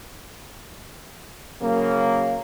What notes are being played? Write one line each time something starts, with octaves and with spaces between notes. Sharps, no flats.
C#3 F#3 A#3